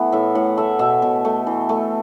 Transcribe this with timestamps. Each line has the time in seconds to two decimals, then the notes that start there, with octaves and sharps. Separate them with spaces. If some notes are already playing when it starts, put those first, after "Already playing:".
Already playing: E3 A3 B3
0.12 A2 E5
0.35 A2 F#5
0.58 A3 E5
0.79 B2 E5
1.02 B2
1.25 A3
1.47 E3
1.69 A3